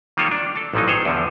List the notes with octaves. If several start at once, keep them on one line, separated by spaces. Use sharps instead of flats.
D#3 G3 A#3 F4 A4 C#5
D4
A4 A5
A1 A#2 F3 F#3 D#4
D#3 G#4 A4 C5 C#5
E2 D3 F3